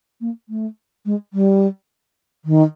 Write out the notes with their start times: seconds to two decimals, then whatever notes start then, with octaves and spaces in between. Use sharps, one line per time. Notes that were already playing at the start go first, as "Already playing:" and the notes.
0.21 A#3
0.49 A3
1.06 G#3
1.33 G3
2.45 D#3